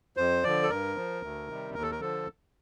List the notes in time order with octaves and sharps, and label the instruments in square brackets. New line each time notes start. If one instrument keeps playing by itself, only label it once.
[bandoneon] F2 C5
D3 F3 D5
A4
G2 A#4
F3
D2
C3 D#3 G3
D#2 A#4
A4
A#4
D3 F3 A4